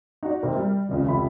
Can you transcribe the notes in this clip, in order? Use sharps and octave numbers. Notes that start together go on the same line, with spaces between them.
D#4 F#4 D5
C3 D#3 A#3 C4
G3
F1 C#2 C#3
F1 C#2 E5 B5